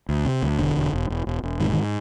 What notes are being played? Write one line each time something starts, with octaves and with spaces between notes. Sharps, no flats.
D2
C3
D2
E1 D3
E1
E1
E1
E1
E1
G#2 D#3
D#3